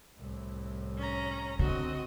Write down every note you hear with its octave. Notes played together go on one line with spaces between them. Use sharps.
C2 A2
C#4 A#5
D3 C4 F#4 D#5